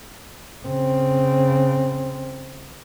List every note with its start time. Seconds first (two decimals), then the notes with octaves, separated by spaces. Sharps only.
0.65 C#3 C4